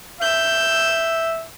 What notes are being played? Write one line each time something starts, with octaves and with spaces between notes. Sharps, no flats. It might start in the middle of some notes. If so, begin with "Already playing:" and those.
E5 E6 G6